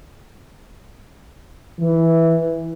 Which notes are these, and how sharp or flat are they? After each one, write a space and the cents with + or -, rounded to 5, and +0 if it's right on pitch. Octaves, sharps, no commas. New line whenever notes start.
E3 -5